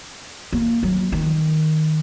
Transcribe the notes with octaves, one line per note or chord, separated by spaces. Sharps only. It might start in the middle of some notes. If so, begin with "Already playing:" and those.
A#3
F#3
D#3